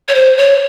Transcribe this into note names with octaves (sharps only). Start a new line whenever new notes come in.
C#5
C5
C#5